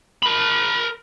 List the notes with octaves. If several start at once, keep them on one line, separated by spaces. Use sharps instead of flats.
A#4 B5